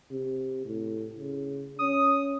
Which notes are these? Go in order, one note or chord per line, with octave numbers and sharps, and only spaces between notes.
C3
A2
C#3
C#4 D#6